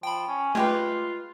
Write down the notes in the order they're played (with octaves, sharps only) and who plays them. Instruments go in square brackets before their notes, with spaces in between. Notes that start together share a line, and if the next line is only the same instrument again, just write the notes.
[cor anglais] F3 [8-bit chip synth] G5 B5
[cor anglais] C#4
[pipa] G#3 G4 B4 [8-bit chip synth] A3 [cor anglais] F4